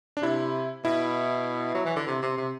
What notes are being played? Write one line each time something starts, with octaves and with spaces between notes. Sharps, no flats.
D4
C3 E4
B2 E4
F#3
E3
D3
C3
C3
C3